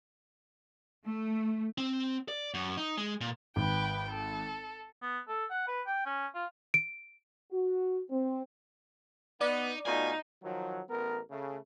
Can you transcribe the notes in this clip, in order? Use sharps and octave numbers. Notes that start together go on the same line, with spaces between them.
A3
C4
D5
F#2
D#4
G#3
A#2
G#1 B4 G5
A4
B3
A4
F#5
B4
G5
C#4
F4
D7
F#4
C4
B3 D#4 D5
B2 A3 D#4 F4 G#5
D#3 F3 F#3
A1 B3 A#4
C#3 A3